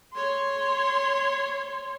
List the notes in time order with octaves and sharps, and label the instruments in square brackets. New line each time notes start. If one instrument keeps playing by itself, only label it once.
[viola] C#5 C6